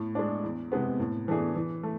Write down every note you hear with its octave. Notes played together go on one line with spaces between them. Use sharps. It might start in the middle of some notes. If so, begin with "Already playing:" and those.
Already playing: A2
G#3 D4
E2
C3 G#3 B3
A2
E3 A3 D4 G#4
E3
A3